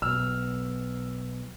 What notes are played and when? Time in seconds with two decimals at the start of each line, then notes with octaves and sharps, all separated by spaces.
0.02 B1 B2 E6 F6